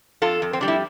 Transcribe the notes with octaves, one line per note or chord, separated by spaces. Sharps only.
F2 F4 A4
F2
C4
G3 D4
E4